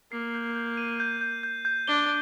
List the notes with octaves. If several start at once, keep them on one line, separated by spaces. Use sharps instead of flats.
A#3 C7
G6
G6
D#7
G6
G6
G6
G6
D4 G7